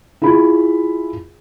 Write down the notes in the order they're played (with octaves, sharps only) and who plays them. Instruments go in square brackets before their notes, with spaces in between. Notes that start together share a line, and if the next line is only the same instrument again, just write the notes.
[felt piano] E4 F4 G#4 B5